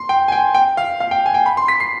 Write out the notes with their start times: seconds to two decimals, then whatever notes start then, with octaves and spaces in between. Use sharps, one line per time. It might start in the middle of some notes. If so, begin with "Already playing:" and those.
Already playing: C6
0.09 G5
0.28 G#5
0.32 G5
0.55 G5
0.77 F5
1.00 F5
1.11 G5
1.26 G#5
1.34 G5
1.46 B5
1.57 C6
1.68 B6
1.80 C7